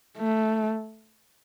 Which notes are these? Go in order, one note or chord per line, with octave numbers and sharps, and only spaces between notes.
A3